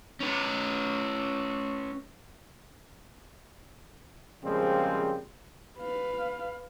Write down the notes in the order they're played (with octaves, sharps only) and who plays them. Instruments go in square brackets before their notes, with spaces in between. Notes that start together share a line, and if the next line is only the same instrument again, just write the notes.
[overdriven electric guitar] C#4 B4
[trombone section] A#2 C#3 F3 G3 G#3 C4
[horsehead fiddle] B4 F5